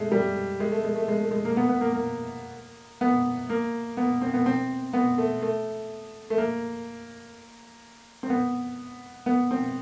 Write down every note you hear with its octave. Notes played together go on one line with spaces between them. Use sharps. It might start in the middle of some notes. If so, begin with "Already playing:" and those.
Already playing: G#3 A3
G3
G#3
A3
G#3
A3
G#3
A3
G#3
A#3
B3
B3
A#3
A#3
B3
A#3
B3
C4
B3
C4
B3
A3
A3
A3
A#3
C4
B3
B3
C4